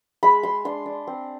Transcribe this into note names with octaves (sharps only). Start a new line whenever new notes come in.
G#3 B5
G#3 C6
D4 C6
D4
C4